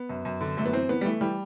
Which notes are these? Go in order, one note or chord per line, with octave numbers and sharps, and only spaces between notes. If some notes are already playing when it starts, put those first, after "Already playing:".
Already playing: B3
F#2
F#2
D3
F#2 A3
B3
E3 C4
E3 B3
G3
E3 A3
E3 G3